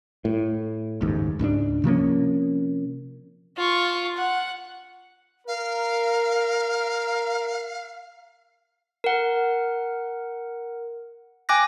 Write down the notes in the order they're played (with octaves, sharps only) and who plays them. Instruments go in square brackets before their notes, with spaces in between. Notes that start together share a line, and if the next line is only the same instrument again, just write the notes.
[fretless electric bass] A2
F#1 D#2 G#2
C#2 G#2 G#3 D4
C3 F3 A#3 C#4
[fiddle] F4 C#6
F#5
[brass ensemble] A#4 [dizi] F5
[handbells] A#4 F#5
G5 G#5 D6 F#6 A#6